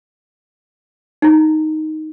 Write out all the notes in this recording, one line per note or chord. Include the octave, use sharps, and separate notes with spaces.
D#4 E4